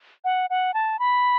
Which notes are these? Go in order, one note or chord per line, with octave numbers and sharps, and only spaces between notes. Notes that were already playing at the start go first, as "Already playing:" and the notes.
F#5
F#5
A5
B5